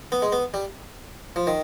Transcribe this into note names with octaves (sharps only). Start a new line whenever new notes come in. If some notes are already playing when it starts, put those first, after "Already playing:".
B3
G#3
B3
G3
F3
D#3